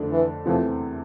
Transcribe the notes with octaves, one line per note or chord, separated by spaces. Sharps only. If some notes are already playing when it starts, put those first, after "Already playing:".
Already playing: F2 D3 A3 D4
E3
E2 C3 E3 F3 A3 C4